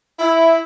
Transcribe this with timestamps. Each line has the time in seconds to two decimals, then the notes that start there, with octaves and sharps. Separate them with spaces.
0.19 E4